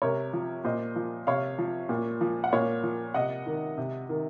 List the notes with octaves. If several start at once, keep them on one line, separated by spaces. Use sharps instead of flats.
C3 A#4 C#5
F3
A#2 C5 D#5
F3
C3 C#5 F5
F3
A#2
F3
F#5
A#2 C#5 F5
F3
C3 D#5 F#5
D#3
C3
D#3